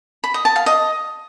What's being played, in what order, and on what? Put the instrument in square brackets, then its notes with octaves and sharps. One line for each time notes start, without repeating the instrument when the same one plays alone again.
[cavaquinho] B5
D#5
A5
F5
D#5